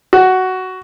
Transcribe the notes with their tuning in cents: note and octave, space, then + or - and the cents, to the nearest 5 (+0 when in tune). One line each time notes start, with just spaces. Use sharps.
F#4 +10